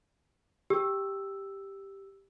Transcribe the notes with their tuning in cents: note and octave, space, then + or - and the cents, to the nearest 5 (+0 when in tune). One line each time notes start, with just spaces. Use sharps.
G4 +0 E6 +0